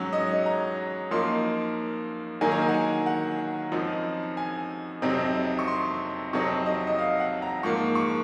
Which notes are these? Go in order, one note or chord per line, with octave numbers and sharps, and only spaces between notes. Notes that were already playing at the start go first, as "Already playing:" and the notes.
Already playing: G#2 F#3 C#4 C#5
D#5
A#5
F#2 F3 A#3 D#4 C6
D#3 F#3 A#3 D#4 G#5
A#5
G#5
F#5
G#5
F#5
F#2 F3 C4 D#4
G#5
F2 C3 F#3 C4 D#4
C#6
C6
F2 C3 F#3 C4 D#4 C#6
D#5
D#5
F5
F#5
A#5
G#2 F3 A#3 C#6
C#6